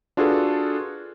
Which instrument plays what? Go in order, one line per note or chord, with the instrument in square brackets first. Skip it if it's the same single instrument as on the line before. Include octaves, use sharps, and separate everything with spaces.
[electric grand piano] D4 F4 F#4 G#4 A4 B4